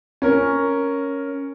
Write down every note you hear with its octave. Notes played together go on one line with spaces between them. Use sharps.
C#4 A#4